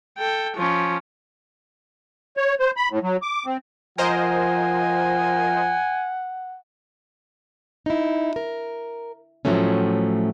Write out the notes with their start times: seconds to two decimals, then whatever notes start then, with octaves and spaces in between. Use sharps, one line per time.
0.18 A4 G5
0.57 F3 C#4
2.37 C#5
2.60 C5
2.77 B5
2.90 A2
3.03 F#3
3.22 D6
3.46 C4
3.98 F3 A#4 C5 D#5 F#5 G#5
7.86 D#4 E4
8.36 A#4
9.45 A2 F3 F#3 A3 C#4